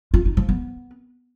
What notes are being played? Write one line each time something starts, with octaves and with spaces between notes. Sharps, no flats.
F4
D#4
F3
B3